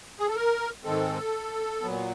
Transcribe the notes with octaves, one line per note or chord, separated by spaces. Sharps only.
G#4
A4
A#4
G#2 D#3 G#3 C4 A4
A#2 F#3 B3